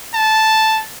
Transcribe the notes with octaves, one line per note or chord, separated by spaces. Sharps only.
A5